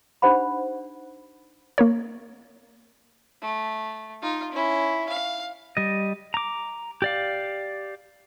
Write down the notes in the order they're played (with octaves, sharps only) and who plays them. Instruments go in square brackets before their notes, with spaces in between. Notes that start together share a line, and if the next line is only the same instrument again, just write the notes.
[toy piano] D4 D#4 G4 C5 F#5 B5
[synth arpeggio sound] A#3 A#4 C#5
[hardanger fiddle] A3
D#4 F4
C#4 E4
F5
[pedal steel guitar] G3 D#5
A#5 D6
G4 D5 F5